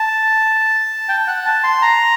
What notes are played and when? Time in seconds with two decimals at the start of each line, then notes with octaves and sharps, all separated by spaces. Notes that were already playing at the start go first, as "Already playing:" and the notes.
Already playing: A5
1.09 G5
1.27 F#5
1.46 A5
1.64 C6
1.82 A#5